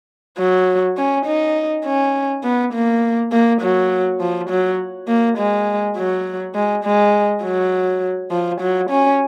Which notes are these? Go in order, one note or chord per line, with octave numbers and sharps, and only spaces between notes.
F#3
C#4
D#4
C#4
B3
A#3
A#3
F#3
F3
F#3
A#3
G#3
F#3
G#3
G#3
F#3
F3
F#3
C#4